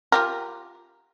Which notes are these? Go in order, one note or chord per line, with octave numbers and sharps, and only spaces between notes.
F4 G4 A#4